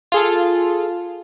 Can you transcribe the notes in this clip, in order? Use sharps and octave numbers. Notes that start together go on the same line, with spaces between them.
F4 G#4 A4